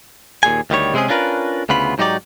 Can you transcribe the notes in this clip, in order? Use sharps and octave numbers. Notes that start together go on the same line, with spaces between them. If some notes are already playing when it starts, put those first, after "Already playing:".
D#2 A#2 G#4 G#5
D2 D#3 G3 C#5
C3 G#3 C4 C#4 G#4
C#4 D4 F4 A#4 B4
D2 C#3 B3 F4 B5
G#2 F#3 D#4 F#4 G4 D5